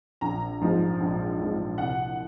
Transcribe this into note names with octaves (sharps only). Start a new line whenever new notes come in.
A#1 A#5
G#2 F3 G#3
A#1
G#2 F3 G#3
C2 F#5